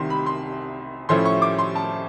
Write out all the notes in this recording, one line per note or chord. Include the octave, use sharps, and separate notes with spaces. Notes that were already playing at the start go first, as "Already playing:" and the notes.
Already playing: C2 C3 D#3 C6
B5
C6
A2 F3 A3 C#4 E4 C6
C#6
D6
C6
A5